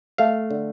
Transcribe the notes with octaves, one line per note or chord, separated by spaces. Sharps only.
A3 F5
D3